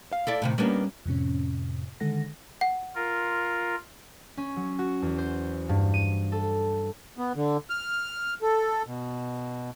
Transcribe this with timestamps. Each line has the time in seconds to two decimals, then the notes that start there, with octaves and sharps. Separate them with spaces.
0.13 F5
0.27 E4 A4 D5
0.42 A2 C3 D#3
0.58 G3 A#3 B3 C#4 D4
1.06 F2 A2 C3 C#4
2.00 D3 D#3 G#3 A4 F#5 A#6
2.61 F#5
2.95 F4 A#4
4.37 C#4
4.56 F#3
4.79 F#4
5.02 E2
5.18 C5
5.69 G2
5.94 D#7
6.32 A4
7.18 B3
7.36 D3
7.70 F6
8.42 A4
8.86 B2